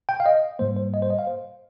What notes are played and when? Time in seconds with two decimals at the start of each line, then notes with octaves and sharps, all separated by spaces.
0.09 G5
0.20 F5
0.26 D#5
0.59 G#2 G3 A#3 C5
0.76 C5
0.94 D#5
1.02 C5
1.10 D#5
1.19 F5
1.27 C5